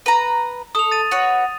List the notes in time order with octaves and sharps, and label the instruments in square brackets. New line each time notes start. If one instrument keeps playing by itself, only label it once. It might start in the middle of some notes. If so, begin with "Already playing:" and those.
[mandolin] B4 A#5
[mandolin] A4 [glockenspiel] D#6 F7
[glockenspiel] A6 D#7
[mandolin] F#4 B4 C#5